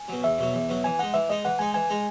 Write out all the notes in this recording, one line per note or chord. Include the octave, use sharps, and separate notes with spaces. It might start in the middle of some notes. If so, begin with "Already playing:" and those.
Already playing: G#5
B2 F#3
E2 E5
B2 F#3
E2
B2 F#3
E3 G#5
G#3 D#4 F#5
E3 E5
G#3 D#4 D#5
E3 F#5
G#3 D#4 G#5
E3 G#5
G#3 D#4